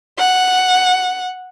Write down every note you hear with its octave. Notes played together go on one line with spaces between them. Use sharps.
F#5